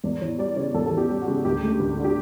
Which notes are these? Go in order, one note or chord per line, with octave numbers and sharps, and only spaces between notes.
E2 D5
E3 C#5
G3 D5
C#3 C#5
E2 A4
A4
E3
G4
G3
F#4
C#3
D2 G4
A3
D2
D3
G4